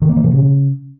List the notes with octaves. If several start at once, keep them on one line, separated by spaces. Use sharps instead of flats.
D#3
A#3
E3
B2
C#3